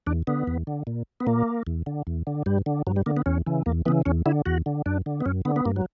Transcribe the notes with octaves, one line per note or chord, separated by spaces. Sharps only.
E2 D4
D3 B3
E2
D3
A#2
B3
A#2 A#3
E2
D3
E2
D3
G2 G3
D3
G2 F#3
G3
D3 A#3
B3
E2 C#4
C#3 E3
E2 A#3
C#3 E3 B3
E2 C#4
D3 E4
E2 F#4
D3
F#2 D4
D3
B3
F#2 C#4
D3 B3
B3
G2 A#3
F#3